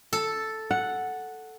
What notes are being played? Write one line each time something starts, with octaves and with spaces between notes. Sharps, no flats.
A4
F#5